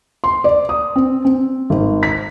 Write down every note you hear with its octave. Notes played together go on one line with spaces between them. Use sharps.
C6
D5
D#6
C4
C4
G#1
B6